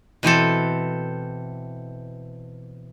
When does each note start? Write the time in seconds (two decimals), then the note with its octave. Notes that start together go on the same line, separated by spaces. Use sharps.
0.23 B2 E3 C4 A4